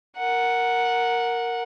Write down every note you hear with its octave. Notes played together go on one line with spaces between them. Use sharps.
A#4 F#5